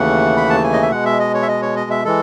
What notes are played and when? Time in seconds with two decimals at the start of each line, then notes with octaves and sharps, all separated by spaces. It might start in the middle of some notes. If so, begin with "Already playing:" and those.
Already playing: D#2 C#3 E3 A3 F#5
0.37 B5
0.50 A5
0.63 G#5
0.73 D#5
0.82 E5
0.90 B2 G#3 F#5
1.05 E5
1.20 D#5
1.34 C#5
1.43 E5
1.48 D#5
1.62 C#5
1.76 D#5
1.91 E5
2.04 E3 G#3 A4